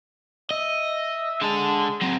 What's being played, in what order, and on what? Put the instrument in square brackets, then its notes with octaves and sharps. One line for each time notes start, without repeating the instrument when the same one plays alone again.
[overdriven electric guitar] D#5 [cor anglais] E5
[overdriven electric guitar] D3 A5 [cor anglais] G#3
[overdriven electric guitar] F#3 C4